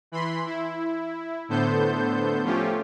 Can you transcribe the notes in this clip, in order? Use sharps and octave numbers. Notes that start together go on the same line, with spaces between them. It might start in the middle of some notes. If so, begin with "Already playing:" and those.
E3 B5 C6
E4
A2 D3 B3 A4 C5 G6
F3 A3 C#4 F4 G4